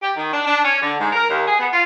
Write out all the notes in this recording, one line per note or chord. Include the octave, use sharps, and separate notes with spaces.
G4
D#3
D4
D4
C#4
D3
G#2
A#4
D#2
G#4
B3
F4